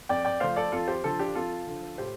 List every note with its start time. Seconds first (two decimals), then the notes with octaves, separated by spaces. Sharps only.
0.09 F2 D5 G5
0.25 D5 G5
0.40 F3 A3 C5 F5
0.56 A4 D5
0.72 F2 F4 A4
0.88 G4 C5
1.04 D3 F3 F4 A4
1.19 D4 G4
1.35 F2 F4 A4
1.67 D3 F3
1.98 A2 G4 C5